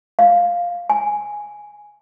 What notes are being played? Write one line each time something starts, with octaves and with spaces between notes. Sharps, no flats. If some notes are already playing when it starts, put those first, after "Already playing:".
F5
G#5